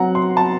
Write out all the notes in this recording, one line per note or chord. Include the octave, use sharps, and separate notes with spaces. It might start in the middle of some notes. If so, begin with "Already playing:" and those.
Already playing: F#3 C4 F#5 A#5
C6
A5